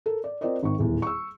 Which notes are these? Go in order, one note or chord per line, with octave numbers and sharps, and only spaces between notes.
A4 A#4
D5
C4 F4 A#4 C5 D5 D#5
G#1 D#3 C#6
D#1 E2
C#6 E6